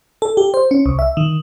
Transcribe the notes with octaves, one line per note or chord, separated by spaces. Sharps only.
A4
G4
C5
C#4
C2
E5
D#3